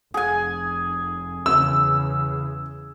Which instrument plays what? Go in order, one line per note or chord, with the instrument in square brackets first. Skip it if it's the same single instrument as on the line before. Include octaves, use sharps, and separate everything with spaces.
[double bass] F1 [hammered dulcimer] G#4 G#5
[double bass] E2 C#3 [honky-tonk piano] E6